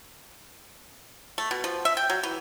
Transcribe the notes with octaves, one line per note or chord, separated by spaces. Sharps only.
A3
B2
F3
E5
G5
F#3
E3